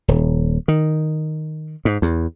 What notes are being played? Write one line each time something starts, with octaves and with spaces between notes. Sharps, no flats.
D#1
D#3
G#2
E2